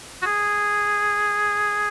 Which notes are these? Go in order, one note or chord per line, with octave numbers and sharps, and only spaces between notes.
F#4
G#4